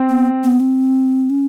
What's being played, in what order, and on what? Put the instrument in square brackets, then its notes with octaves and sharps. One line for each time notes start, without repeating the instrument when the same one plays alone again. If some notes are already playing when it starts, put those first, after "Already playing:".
Already playing: [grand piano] C4
[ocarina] B3
B3
C4
C#4